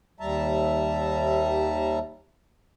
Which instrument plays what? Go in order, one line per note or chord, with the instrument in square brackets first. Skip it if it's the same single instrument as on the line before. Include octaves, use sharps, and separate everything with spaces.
[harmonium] D#2 G3 E5 A5 A#5